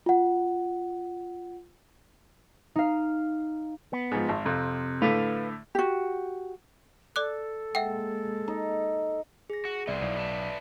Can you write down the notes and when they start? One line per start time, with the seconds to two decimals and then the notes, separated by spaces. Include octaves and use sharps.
0.06 F4 F#5
2.76 D#4 F5
3.93 B3
4.11 G#2 F3
4.29 G#1
4.46 F2 C3
5.02 A2 D3 A3 B4 F5
5.75 F#4 G4
7.16 A4 D5 D6 F#6
7.75 G#3 A#3 E5 F#5 G5
8.48 D#4
9.50 G#4 A#6
9.65 F#4
9.87 C2 B3 E4 C5 D5 E5
10.02 B1 D5
10.17 B4 E5 A5